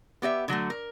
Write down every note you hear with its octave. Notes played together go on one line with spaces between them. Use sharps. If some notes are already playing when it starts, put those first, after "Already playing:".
B3 G4 D#5 E5
D3 F#3 G#3 A3
A#4